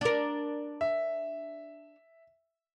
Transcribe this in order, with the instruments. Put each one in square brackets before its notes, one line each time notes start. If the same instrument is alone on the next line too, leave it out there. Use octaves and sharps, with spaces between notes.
[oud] D4 A#4
[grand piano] E5